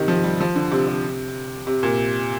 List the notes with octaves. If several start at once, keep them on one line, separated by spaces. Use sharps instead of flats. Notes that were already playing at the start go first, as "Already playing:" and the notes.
Already playing: C3 D#3
F3
G3
F3
D3
C3
C3
C3
A#2